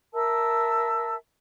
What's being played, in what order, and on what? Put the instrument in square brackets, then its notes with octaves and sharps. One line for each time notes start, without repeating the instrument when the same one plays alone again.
[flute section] A#4 E5 A5 E6